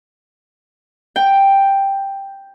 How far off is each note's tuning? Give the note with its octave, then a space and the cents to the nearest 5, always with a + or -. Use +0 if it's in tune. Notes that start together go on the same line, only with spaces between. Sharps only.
G5 +5